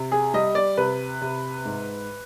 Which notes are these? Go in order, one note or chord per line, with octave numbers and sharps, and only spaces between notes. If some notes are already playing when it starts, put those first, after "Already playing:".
Already playing: C3
G#4
G3 D#5
D5
C3 B4
C3
G#2